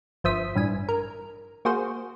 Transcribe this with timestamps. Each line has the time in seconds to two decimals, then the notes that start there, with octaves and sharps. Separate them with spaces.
0.24 G1 F3 C5 E5 D#6 B6
0.55 A1 G2 G#5
0.89 A#4
1.65 A#3 F#4 G#4 C5